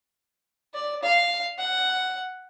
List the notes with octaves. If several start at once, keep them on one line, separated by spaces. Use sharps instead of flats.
D5
F5
F#5